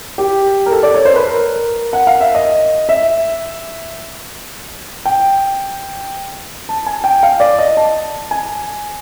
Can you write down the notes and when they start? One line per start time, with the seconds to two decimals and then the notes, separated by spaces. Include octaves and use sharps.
0.18 G4
0.66 A#4
0.72 A4
0.83 D5
0.94 C#5
1.05 C5
1.16 B4
1.27 A#4
1.93 F#5
2.07 F5
2.20 E5
2.35 D#5
2.89 E5
5.06 G5
6.69 A5
6.86 G#5
7.04 G5
7.23 F5
7.40 D5
7.59 D#5
7.77 A5
8.31 G#5